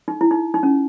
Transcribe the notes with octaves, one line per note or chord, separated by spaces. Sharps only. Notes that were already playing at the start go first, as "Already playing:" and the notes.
D#4
E4
D#4
D#4
C#4